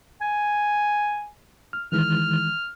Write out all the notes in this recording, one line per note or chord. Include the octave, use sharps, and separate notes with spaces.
G#5
F6
D#3 E3 G#3 F6